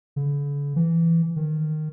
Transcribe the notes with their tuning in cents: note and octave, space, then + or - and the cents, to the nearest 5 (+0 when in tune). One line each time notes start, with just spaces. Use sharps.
D3 -45
E3 +15
D#3 -15